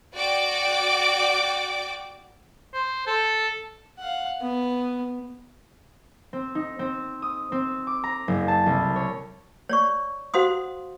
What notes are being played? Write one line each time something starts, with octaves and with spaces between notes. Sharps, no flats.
F#4 D5 G5 D6
C5
A4
F5 F#5
B3
C4
D#4
C4
D#6
C4
D6
A#5
F#1
A5
C2
C#5
C#5 D5 C#6
F#4 C5 F5 F#5 C6 D#6